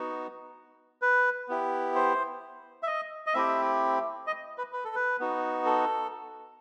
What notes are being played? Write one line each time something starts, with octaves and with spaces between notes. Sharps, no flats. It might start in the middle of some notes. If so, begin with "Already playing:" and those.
Already playing: B3 D#4 F#4
B4
B3 E4 G4
C5
E5
D#5
D#5
A3 C4 E4 G4 E5
D#5
B4
B4
A4
B4
B3 D#4 F#4
A4